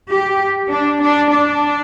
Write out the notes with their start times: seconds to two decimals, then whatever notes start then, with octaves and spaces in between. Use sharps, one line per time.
0.10 G4
0.70 D4
1.01 D4
1.31 D4